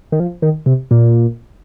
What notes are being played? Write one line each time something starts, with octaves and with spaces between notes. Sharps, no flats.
D#3
F3
D#3
C3
A#2